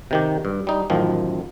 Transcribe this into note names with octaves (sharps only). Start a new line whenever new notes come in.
C3 D#3 G4
G2
G3 D#4
A1 F#2 D#3 F3